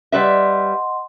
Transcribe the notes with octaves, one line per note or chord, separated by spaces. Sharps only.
G3 B4 D#5 E5 F#5 C6